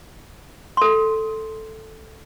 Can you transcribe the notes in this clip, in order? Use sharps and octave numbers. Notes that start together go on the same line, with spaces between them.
A4 C6